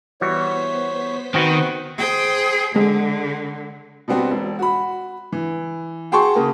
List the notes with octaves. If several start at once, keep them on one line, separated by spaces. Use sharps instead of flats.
E3 G3 B3 F#4 C5 C#5 B6
D#3 C4 F#4 B4
G#4 C5 G5
D3 G#3
B2 G3 B3 C4 F#4
E1
F#4 B5
E3
F#4 G#4 G5 A5 C6 C#6
C#3 A#3